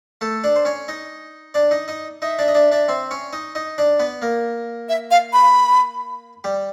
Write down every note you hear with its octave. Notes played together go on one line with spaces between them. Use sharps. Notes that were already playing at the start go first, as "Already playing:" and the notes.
A3 A4
D4 D5
C5
C#4 C#5
D#4 D#5
D4 D5
D#4 D#5
D#4 D#5
D#4 D#5 E5
D4 D5
D#5
D4 D5
D4 D5
C4 C5
C#4 C#5
D#4 D#5
D#4 D#5
D4 D5
B3 B4
A#3 A#4
E5
F5
B5
G3 G4